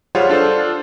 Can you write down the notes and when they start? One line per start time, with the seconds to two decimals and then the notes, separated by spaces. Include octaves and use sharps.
0.15 G3 F4 G#4 C5 C#5 F#5
0.29 D4 F4 A4 C5